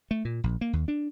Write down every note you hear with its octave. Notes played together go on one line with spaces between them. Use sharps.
A3
A#2
A#1
A#3
D#2
D4